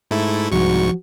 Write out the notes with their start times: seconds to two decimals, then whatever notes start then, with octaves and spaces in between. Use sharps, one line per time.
0.11 G#2 A3 E4
0.52 C2 G#2 F3 F#4 C#6